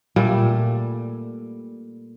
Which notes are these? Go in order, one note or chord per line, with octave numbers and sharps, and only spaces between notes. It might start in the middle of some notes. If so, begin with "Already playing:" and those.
A#2 G3 A3